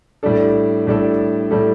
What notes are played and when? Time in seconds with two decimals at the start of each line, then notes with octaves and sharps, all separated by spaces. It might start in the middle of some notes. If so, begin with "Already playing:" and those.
0.23 A2 G3 D4 A4
0.87 A2 G3 D4 A4
1.51 A2 G3 D4 A4